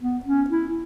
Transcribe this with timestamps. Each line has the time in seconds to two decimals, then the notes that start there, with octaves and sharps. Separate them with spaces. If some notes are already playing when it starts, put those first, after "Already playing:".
0.01 B3
0.25 C#4
0.50 E4